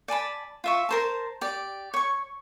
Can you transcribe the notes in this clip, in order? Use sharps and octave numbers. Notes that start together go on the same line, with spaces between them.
D5 G#5 A5 B5
F4 E5 C#6
A#4 C5 A5
G4 D5
C#5 C#6